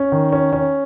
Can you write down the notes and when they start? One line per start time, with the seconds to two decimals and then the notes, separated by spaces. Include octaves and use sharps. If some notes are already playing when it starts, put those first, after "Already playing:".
Already playing: C#4
0.12 D#3
0.32 C#4
0.53 C#4